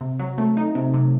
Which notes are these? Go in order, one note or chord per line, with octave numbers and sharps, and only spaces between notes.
C3
F#3
A3
D#4
C3
C3